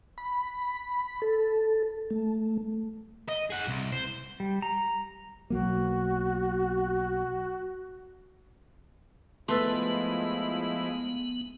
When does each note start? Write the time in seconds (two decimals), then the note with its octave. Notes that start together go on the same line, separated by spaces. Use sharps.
0.18 B5
1.22 A4
2.10 A3
3.28 D#5
3.50 G#4 F#5
3.68 C2
3.92 C5
4.40 G3
4.62 A#5
5.50 B1 F#3 A#3 F#4
9.49 F3 G#3 A3 B3 E4 A4 B4 C6